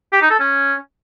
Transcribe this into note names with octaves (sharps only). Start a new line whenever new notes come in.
G4
D#4
A4
C#4